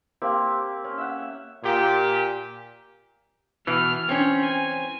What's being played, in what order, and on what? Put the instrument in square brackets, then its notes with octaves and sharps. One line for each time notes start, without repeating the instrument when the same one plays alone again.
[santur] A#3 C4 G4
C#4
E5 F#5
[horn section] A#2 G4
[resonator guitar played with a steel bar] B2 [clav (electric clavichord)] E3 [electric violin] F6
[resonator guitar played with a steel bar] C4 C#4 [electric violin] C#5
[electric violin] G#5